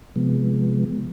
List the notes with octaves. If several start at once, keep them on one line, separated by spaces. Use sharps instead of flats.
C3 F3 G#3 B3